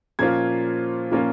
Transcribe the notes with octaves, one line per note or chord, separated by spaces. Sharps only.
A#2 F3 A#3 C#4 F4 G#6
A#2 F3 A#3 C#4 F4